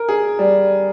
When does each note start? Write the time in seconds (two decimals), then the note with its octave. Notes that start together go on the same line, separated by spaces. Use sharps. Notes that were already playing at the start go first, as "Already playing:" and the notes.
Already playing: A#4
0.08 G#4
0.39 G3